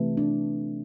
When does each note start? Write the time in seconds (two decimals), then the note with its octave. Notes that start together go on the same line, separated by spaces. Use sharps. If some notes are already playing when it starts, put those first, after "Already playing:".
Already playing: C3 E3 A3
0.17 D4